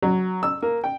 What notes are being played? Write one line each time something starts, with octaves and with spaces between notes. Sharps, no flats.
F#3
E6
A#3
G5